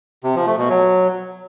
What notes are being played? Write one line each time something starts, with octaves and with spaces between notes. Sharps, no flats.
C3
F3
A3
B2
F#3